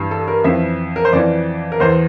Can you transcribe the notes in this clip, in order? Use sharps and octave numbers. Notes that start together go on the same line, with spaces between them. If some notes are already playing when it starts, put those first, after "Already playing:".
Already playing: G2 E3
A4
A#4
F2 E3 E5
A#4
C5
F2 E3 D5
A#4
E2 E3 C5